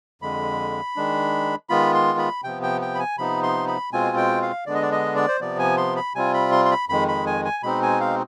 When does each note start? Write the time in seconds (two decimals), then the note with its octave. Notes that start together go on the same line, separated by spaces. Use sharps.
0.22 F2 D3 G#3 B5
0.96 D#3 G#3 D4
1.69 D#3 G#3 B3 F4 B5
1.94 C6
2.19 B5
2.44 C3 F3 B3 G5
2.63 G5
2.81 G5
2.95 B5
2.99 G#5
3.18 C3 F3 B3 D#4 B5
3.43 C6
3.67 B5
3.93 B2 G#3 C4 F4 G#5
4.17 G5
4.42 F5
4.66 D3 G#3 B3 D4 D5
4.75 D#5
4.82 D5
4.92 D#5
5.16 D5
5.28 C5
5.41 C3 F3 B3 D5
5.59 G#5
5.77 C6
5.97 B5
6.15 C3 G3 C4 F4 G#5
6.34 B5
6.52 C6
6.65 C6
6.71 B5
6.89 F2 D#3 G#3 B5
7.08 B5
7.26 G#5
7.45 G#5
7.63 B2 G#3 C4 D#4 B5
7.82 G#5
8.00 F5